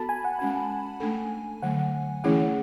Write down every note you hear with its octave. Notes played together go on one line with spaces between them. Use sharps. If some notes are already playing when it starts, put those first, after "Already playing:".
Already playing: B3 F#4 A4 A5 B5
G#5
F#5
G#3 C#4 F#4 G#5
A3 D4 A4
D3 F#3 A3 F#5
E3 A3 C#4 E4 G#4 F#5